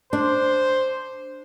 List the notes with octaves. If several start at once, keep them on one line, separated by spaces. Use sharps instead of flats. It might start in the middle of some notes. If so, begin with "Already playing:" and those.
D4 C5